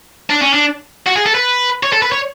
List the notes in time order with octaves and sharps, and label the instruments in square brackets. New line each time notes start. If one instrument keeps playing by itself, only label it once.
[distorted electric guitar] D4
C#4
D4
F#4
G#4
A4
B4
C#5
A4
B4
C#5